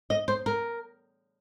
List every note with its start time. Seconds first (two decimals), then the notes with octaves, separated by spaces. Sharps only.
0.10 D#5
0.28 C5
0.46 A#4